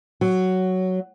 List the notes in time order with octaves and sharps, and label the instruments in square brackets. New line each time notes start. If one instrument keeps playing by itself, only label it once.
[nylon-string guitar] F#3